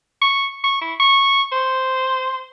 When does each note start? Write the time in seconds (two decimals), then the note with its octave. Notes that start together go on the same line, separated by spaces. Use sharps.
0.22 C#6
0.64 C#6
0.81 E4
1.00 C#6
1.52 C5